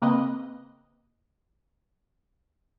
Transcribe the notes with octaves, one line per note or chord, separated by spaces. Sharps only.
C#3 A#3 C4 B4 D#5